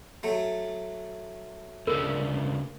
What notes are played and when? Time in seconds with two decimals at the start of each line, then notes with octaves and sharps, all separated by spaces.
0.23 F#3 A3
1.87 D2 C#3 A#4